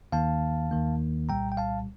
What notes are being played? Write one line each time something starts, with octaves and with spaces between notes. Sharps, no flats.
D#2 D#3 A#3 F5 A5
D#2 D#3 A#3
C2 A#2 G3 G5 A#5
G5
F5 A5